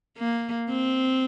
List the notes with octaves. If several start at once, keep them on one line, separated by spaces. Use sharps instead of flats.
A#3
C4